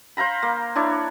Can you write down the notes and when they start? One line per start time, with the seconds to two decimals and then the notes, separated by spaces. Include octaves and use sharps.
0.17 C5 F5 A#5 B5
0.42 A#3
0.76 D4 E4 C#5